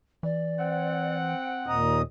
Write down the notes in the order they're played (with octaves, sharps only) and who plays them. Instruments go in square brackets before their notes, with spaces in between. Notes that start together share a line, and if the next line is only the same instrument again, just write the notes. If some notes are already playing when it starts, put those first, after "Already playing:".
[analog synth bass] E3 [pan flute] D5
[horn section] C4 F#5
[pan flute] G5
[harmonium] D#2 A#2 D#5 [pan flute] A#5